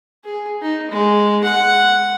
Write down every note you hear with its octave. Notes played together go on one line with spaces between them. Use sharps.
G#4
D#4
G#3
F#5